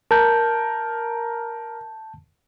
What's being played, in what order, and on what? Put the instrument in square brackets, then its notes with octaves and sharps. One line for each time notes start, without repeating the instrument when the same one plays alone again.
[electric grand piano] A#4 [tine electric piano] A5 G6